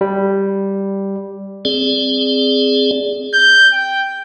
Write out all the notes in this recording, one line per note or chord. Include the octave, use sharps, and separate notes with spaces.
G3
C4 G#4 D5
G6
G5